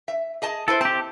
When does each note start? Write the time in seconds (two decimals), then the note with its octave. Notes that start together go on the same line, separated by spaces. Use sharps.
0.08 E5
0.42 G#4 D#5 A5
0.68 E4 A4 B4 C5
0.81 C4 G4 A5